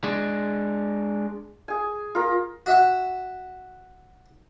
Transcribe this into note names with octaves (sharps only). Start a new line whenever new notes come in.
G#3 D4
G#4 G#5
F4 A#4
F#4 E5 F#5